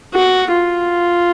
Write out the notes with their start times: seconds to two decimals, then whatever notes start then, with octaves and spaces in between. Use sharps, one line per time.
0.15 F#4
0.52 F4